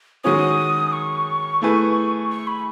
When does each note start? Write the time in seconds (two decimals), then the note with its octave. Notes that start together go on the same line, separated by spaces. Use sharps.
0.24 D#3 G#3 C#4 F#4 C#5 D#6
0.93 C#6
1.62 A3 E4 G#4 B4
2.30 C#6
2.47 B5